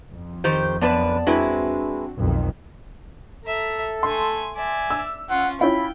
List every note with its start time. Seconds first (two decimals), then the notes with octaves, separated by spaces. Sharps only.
0.12 F2
0.44 D#3 G4 C5 G6
0.81 F#2 B3 D4 B4 D5 A5
1.27 G#3 C4 D4 E4 F#4 B4
2.18 B1 F2 D#3
3.45 A4 E5 A#5
4.03 A3 G#5 C6
4.56 D5 E5 G#5
4.91 E6
5.30 C#4 F4 F#5
5.61 C#4 E4 F4 G5 B5